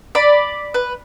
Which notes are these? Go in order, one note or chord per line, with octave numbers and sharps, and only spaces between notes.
D5 B5
B4